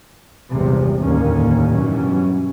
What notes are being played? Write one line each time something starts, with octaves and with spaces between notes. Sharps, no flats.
G#1 E2 G2 C3 F3
F1 D#2 A2 D3 A#3 C#4
G2 B2 E3 F#3 C#4